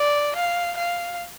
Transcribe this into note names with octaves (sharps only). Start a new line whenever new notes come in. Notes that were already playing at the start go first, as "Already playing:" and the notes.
Already playing: D5
F5
F5